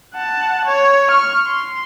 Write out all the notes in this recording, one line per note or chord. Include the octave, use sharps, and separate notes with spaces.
F#5 A5
C#5
C#6 F6
C6